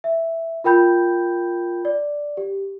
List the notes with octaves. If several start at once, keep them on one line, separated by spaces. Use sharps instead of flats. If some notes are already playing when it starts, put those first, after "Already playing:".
E5
F4 A#4 G5 B5 G6
D5
G4